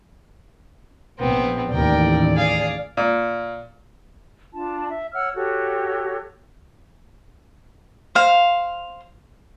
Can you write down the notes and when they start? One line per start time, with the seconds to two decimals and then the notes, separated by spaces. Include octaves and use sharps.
1.19 A#1 B3 C4
1.73 A1 D#2 A#4 D5 G5
2.36 G#4 F5
2.97 A#2
4.54 D4 F4 A5
4.89 E5
5.13 C#5 F#5 E6 F6
5.35 F#4 G4 A4 C#5
8.15 C5 F5